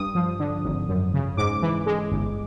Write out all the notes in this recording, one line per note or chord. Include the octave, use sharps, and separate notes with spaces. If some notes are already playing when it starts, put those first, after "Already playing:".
Already playing: G2 D#6
F3
D3
G#1
F#2
C#3
G#2 D6
E3
G#3
G1